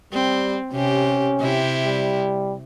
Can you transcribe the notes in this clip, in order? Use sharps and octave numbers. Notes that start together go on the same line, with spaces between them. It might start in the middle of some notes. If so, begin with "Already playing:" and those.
G3 C4
C3 C#4 G4
C3 E4 G4
G3